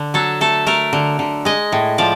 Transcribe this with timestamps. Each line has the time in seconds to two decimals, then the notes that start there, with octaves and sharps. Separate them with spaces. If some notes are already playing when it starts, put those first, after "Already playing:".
Already playing: D3
0.14 F#3 A4
0.41 A3 A4
0.66 A3 A#4
0.93 D3
1.19 D3
1.45 G#3 D#5
1.72 A2
1.98 F3 D5